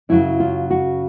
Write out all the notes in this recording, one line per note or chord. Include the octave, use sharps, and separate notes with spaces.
F#2 C#3 F#3 E4
F4
F#4